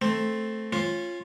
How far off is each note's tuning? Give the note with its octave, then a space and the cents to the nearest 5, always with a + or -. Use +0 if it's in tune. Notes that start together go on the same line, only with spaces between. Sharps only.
A3 +0 C4 +5
C#4 -25 F4 +0